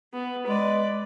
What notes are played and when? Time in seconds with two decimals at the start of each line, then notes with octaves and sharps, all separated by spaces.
0.13 B3
0.47 G#3 B4 D5